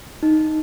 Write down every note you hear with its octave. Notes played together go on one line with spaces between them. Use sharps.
D#4